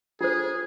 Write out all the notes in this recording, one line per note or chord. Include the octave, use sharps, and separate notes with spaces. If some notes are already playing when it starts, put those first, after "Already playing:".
F4 G#4 A4 C5